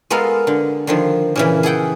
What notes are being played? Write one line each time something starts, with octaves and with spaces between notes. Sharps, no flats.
G#3 B3 F4 A4 A#4 F5
D3
D3 D#3 F3
A#2 C#3 E3
G#4 A4 F#5 G5